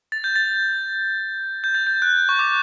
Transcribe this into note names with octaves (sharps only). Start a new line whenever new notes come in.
A6
G6
A6
G6
A6
G6
F#6
C#6
D6